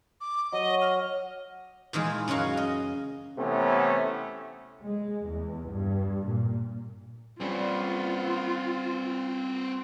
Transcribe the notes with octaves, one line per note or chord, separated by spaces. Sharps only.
D6
F#3 D#5
F6
A#2 D#3 E3 G#3
F#2 C#3 G#3 F#4 F5
D#5
C3 E3 A3 B3 C#4
G#3
E2
G2
A#2
G3 C4 C#4 F4 B4